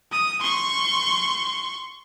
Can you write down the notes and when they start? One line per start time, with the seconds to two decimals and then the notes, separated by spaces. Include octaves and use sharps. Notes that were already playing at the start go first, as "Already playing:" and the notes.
0.12 D#6
0.41 C6 C#6